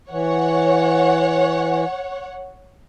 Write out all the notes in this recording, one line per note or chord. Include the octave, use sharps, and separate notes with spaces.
E3 C#5 F#5